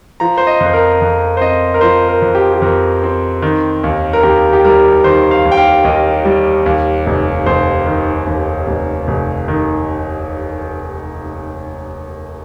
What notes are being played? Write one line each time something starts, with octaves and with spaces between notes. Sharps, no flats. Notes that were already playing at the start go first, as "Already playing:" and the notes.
F3 A#5
C5
D#5
F2
C5
A#4
F2
C5
C4 D#5
A#4
F3 C5
A#4
F2
G4
G4
F2 A#4
C4
D#3
D#2
A#4
D#2 G4
G4
G3 A#4
D#3 C5
F5
D#2
G5
F5
D#2 D#5
G3
D#2
F1
F1 C5
D#3
D#2
F1
F1
D#3